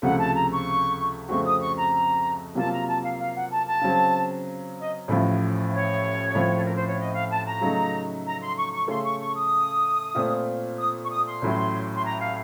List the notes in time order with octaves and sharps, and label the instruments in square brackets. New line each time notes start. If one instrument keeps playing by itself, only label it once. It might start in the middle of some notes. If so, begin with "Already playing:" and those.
[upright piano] C#2 C3 F3 A3 [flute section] F#5
[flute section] A5
A#5
C#6
[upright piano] F2 C#3 A3 C4 F#4 [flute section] C#6
[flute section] D#6
C#6
A#5
[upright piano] C3 F#3 A#3 F4 [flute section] A5
[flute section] A#5
A5
F5
F5
F#5
A5
A5
[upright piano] C#3 F#3 C4
[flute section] D#5
[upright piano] A1 A2 F3
[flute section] C#5
[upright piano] A2 F3 C4
[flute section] A4
A#4
C5
C#5
D#5
F5
A5
A#5
[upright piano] C#3 F#3 A3 D#4
[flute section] A#5
C6
C#6
C#6
[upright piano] C#3 A3 C#4 A4 [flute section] C6
[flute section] C#6
C#6
D#6
[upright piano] A#2 A3 C4 F4
[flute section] D#6
C#6
D#6
C6
[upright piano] A1 A2 F#3
[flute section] C6
A#5
F5